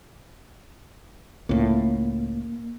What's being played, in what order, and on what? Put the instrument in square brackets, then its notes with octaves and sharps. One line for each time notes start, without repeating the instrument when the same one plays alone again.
[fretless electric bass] C#2 A2 [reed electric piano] A#3